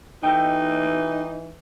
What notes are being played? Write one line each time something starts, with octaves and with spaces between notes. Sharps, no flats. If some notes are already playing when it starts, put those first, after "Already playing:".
E3 D#4 A4 D#5 G5